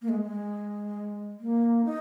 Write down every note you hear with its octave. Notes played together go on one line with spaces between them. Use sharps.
A#3
G#3
G#3
A#3
D#4